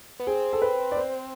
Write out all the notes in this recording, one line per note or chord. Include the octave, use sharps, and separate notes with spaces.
B3
C4 G#4
A4
B4
D5
C5